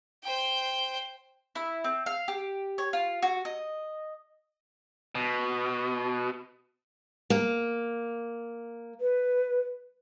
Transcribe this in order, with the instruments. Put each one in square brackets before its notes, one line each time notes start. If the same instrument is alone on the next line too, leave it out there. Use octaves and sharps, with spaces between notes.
[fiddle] C5 G5
[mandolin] E4
C4
F5
G4
C#5
F4
F#4
D#5
[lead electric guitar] B2
[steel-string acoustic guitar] A#3
[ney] B4